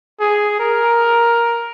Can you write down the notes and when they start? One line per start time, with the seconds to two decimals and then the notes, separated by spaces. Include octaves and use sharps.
0.20 G#4
0.60 A#4